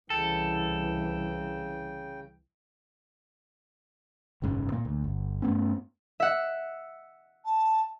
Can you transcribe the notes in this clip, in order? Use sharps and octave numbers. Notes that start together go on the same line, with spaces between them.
C2 C#3 E3 A4 G5
F#1 B1 G#2 C#3
A#2 A#3
D2
G1
G2 A3 B3 C#4
E5 F#5
A5